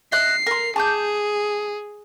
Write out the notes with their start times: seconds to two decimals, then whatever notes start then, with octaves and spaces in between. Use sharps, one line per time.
0.12 D#5 E5 F#6 C7
0.46 A#4 C6
0.76 G#4 A5 D6 G6